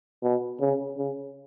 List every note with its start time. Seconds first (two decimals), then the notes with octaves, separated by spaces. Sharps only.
0.23 B2
0.60 C#3
0.98 C#3